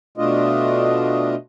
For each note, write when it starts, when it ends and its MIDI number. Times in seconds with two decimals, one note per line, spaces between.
0.18 1.35 47
0.18 1.35 57
0.18 1.35 62
0.18 1.35 65
0.18 1.35 75